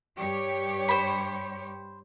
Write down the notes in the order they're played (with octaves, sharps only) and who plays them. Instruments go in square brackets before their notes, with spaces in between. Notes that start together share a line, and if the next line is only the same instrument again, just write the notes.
[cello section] G2 G4 C#5
[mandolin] C5 B5